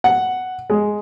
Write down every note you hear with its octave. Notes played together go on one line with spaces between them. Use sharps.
F#5
G#3